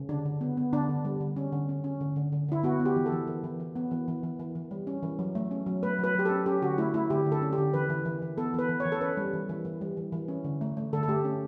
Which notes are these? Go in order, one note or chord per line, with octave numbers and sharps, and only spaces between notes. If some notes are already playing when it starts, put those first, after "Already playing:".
Already playing: C#3
D3 D4
D3
B3
B3
D3 D4
D3
G3
D3
C#4
D3
C#4
C#4
D3
D3
D3
D3 E4
B3 F#4
B3
G4
E3
A4
E3
E3
E3
E3
B3
E3
E3
E3
E3
E3
G3
C#4
E3
F#3
A3
C#4
F#3
A3 B4
F#3 B4
F#3 G4
A4
C#4
C#4 G4
D3 F#4
A3 E4
A3 E4
D3 G4
D3
A4
C#4
G4
D3
E3 B4
E3
E3
E3
B3 A4
E3 B4
E3
C#5
E3
A4
C#4 B4
G3
E3
E3
E3
G3
E3
E3
C#4
D3
A3
A3
D3 A4
A4
A3 G4
C#4